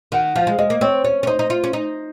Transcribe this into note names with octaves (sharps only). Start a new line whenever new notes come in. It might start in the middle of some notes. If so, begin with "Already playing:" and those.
D#3 F#5
F3 F5
G#3
G#3 D#5
A#3
C4 C#5
C#4 C#5
C#4
D#4 C5
D#4
F4
C#4
D#4